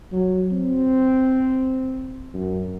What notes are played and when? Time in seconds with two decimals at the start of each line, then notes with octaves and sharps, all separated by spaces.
0.12 F#3
0.52 C4
2.34 F#2